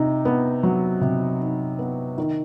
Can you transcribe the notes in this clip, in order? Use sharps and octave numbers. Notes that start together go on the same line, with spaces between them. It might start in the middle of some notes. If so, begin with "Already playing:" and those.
Already playing: C3 D#4
B3
F#3
C3
D#4
B3
D#3